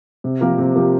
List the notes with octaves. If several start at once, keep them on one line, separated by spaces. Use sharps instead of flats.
C3
F3 A#3 G4 A#4
C3
F3 A#3 G4 A#4